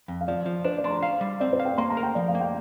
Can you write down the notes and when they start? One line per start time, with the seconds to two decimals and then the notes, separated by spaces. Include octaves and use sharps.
0.08 F2
0.21 F5
0.28 F3 D5
0.46 F3
0.64 D4 C5
0.78 D5
0.84 D4 C6
0.90 A#5
1.03 F5
1.21 G3
1.40 C4 D5
1.53 C5
1.60 F5
1.65 G5
1.78 A#3 C6
1.90 A#5
1.97 A#4
2.03 G5
2.15 F3 D5
2.28 F5
2.35 A#3
2.40 G5